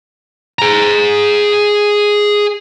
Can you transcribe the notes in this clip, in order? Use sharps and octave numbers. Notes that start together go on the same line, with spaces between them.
G#4 A#5